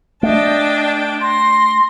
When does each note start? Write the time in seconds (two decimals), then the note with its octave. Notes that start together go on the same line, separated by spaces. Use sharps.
0.23 A3 D4 D#5 G5 A5
1.21 C6 A#6